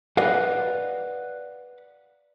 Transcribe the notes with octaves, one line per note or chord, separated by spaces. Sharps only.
B4 D5 D#5 F5 F#5